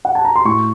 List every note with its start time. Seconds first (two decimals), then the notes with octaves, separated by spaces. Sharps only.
0.05 F#5
0.15 A5
0.25 A#5
0.36 C6
0.45 A2 C#6